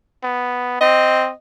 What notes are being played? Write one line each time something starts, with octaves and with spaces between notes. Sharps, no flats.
B3
C4 D#5